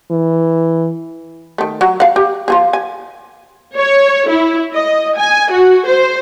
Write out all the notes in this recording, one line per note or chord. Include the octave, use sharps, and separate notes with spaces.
E3
D#3 A3
F#3
F5 F#5
G4
F3 F4 G#4
G#5
C#5
E4
D#5
G#5
F#4
C5